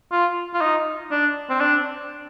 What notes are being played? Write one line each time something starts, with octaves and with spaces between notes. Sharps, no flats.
F4
F4
D#4
D4
C4
D4